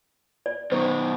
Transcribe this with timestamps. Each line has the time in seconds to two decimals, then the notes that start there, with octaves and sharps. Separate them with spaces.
0.46 D5
0.72 B2 D#3 C5